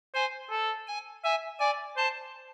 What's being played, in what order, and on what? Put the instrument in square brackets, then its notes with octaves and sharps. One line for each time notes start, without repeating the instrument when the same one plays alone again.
[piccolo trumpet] C5 [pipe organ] G#5
[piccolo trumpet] A4
[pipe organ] G#5
[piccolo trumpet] E5 [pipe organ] G#5
[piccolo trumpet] D5 [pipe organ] G#5
[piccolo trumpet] C5 [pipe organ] A5